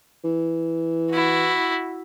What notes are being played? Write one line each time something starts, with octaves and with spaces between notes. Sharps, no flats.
E3
E4 F#4